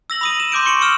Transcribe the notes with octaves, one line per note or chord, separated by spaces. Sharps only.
E6 A#6 F#7
B5 D#6 D#7
E7
C6 D6 G6 D7
C#6 C#7 D7 F#7
C#6 E6 F6 E7